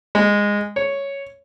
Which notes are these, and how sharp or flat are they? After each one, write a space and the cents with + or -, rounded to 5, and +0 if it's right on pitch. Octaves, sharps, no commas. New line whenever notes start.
G#3 -15
C#5 +0